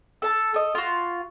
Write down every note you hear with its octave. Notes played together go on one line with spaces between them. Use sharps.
A4 A5
A4 D#5
F4 F#4